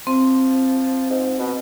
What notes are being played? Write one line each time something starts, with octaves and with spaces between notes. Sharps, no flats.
F3 C4
G#2
B2